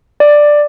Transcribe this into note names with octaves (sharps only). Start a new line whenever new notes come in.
D5